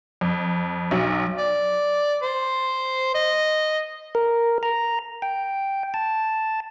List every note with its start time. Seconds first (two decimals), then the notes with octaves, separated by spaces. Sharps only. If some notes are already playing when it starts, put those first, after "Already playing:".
0.21 F2
0.91 B1 F#3
1.38 D5
2.22 C5
3.15 D#5
4.15 A#4
4.63 A#5
5.22 G5
5.94 A5